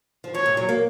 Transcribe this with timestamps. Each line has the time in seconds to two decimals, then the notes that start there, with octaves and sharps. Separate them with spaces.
0.24 F3
0.34 D#3 C#5
0.46 A#2
0.57 F#3
0.69 A#3